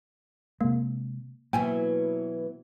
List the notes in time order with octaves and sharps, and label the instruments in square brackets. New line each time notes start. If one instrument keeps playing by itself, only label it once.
[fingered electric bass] C3 G#3 [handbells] A#3
[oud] B2 E3 F#3 [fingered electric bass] A#3 [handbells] G5 G#5